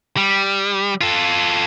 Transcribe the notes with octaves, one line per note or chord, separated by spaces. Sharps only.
G3
F4 A4